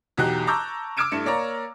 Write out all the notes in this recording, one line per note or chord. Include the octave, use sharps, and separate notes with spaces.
B1 E2 D#4 F#4 G4 F#6
A5 A#5 C#6 D6 E6 G6
D6 E6 F6 G#6 D7 E7
G2 A3 E4 C#7 E7
A#3 C#5 D5 A#5